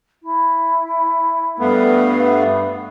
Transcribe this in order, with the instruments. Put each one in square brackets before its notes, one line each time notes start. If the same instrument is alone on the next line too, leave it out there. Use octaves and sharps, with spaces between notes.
[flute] E4
[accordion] G2 A3 B3 [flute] F5